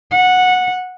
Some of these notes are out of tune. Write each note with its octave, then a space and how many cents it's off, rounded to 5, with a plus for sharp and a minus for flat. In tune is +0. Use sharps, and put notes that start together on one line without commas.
F#5 -15